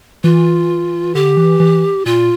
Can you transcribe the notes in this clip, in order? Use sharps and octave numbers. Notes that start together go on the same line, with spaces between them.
E3 F4
D3 G4
E3
E3
A#2 F4